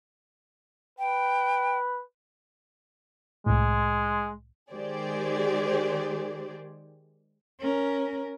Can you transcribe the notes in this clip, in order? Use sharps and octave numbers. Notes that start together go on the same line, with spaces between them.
B4 G5
C2 A2 G#3
D#3 G#3 G4 G#4 C5 D5
C#4 A#4